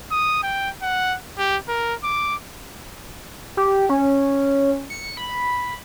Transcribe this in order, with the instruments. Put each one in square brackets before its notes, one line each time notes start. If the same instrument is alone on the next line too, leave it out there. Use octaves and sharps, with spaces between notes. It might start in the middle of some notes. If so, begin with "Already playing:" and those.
[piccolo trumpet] D#6
G5
F#5
G4
A#4
D6
[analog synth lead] G4
C#4
C#7
B5